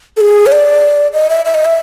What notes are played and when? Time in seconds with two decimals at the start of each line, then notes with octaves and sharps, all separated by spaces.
0.17 A4
0.21 G#4
0.46 C#5
0.52 D5
1.13 D#5
1.30 E5
1.45 E5
1.54 D#5
1.65 E5